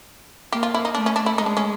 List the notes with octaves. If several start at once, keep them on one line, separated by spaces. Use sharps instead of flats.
A#3 G4
F4
E4
D#4
A3 D4
C#4
D4
E4
G#3 D#4
D4
C#4